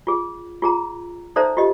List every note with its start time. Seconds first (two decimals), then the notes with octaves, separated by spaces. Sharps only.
0.07 F4 G#4
0.62 F4 G#4 A#5
1.36 D#4 A4 C5 D5 E5 A#5
1.57 F4 G4 D#5